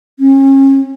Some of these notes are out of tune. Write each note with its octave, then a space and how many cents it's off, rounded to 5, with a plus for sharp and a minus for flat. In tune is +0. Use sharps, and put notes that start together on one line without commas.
C#4 -35